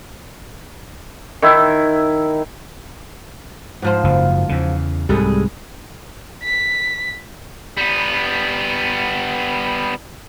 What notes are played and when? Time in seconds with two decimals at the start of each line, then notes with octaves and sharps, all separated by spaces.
1.42 D#3 E4 E5
3.82 G#2 F3 C5
4.04 F#1 F#2 C#3
4.49 E2 C#3
5.09 C2 G#2 G3 G#3 A4
6.43 B6
7.77 G3 B3